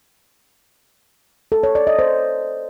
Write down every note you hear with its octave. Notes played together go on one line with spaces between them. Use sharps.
A4
C#5
D5
D#5
C5